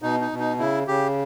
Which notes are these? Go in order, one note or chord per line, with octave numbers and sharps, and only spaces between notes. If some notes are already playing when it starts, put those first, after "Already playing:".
B2 D#4
D#4
B2
D#4
C#3 E4
C#3 G4